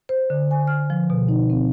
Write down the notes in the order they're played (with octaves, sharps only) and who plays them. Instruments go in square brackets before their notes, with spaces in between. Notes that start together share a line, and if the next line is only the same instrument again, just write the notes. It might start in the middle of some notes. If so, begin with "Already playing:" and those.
[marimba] C5
D3
G#5
F6
F3
B2
D#4
C4